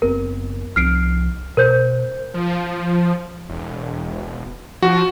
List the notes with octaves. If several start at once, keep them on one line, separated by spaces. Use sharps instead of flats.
F#1 B3 C4 A#4
C2 F3 C4 F6 C7 D7
B2 A#4 C5 G6
F3
E1
F3 F#4